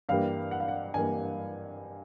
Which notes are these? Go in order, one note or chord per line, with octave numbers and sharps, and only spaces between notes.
G2 E3 G3 A#3 F5
F#5
F5
F#5
G2 E3 G3 A#3 G#5